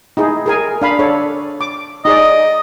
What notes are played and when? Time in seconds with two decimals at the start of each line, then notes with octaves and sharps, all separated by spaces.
0.17 D#4 E4 G#4
0.46 G#4 A#4 G#5
0.82 D4 F5 B5
0.99 D4 A4 C#5
1.61 D6
2.05 D#4 G#4 D5 D#5